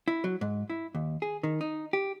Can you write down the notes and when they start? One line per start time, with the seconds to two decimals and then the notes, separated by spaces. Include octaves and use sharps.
0.08 E4
0.24 F#3
0.41 G#2
0.70 E4
0.95 D#2
1.22 G#4
1.43 D#3
1.61 D#4
1.93 G4